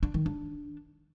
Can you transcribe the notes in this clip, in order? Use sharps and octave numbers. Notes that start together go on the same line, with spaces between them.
D4
D#3
D4